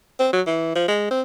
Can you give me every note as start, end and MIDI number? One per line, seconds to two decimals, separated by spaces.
0.20 0.30 60
0.33 0.41 54
0.46 0.72 52
0.76 0.88 53
0.88 1.11 56
1.11 1.22 60